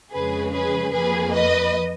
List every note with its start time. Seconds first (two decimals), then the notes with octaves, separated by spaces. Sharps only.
0.13 F2 C#3 G#3 G#4 B4
0.53 G#4 B4
0.93 F2 F3 A#3 G#4 B4
1.34 B4 D#5